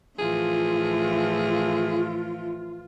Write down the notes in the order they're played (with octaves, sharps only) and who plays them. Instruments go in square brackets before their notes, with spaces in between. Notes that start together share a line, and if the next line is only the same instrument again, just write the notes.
[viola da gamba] A2 E3 F3 [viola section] F4 [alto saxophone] G#4